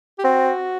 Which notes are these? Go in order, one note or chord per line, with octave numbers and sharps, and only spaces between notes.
G4
C4 F#4